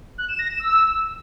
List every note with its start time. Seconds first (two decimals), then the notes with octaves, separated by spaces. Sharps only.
0.18 F#6
0.28 E7
0.39 A#6
0.49 E7
0.60 E6